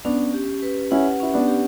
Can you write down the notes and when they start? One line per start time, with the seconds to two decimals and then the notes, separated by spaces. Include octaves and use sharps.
0.05 B3 C#4 D4
0.34 G4
0.62 B4
0.91 C#4 E4 F#5
1.20 C#4 E4
1.34 B3 D4
1.48 G4